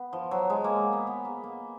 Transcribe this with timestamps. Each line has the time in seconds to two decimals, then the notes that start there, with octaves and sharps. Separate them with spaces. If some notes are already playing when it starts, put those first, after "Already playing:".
Already playing: B3
0.13 F3
0.31 F#3
0.50 G#3
0.64 A#3
0.93 B3
1.07 B3
1.25 A#3
1.44 A#3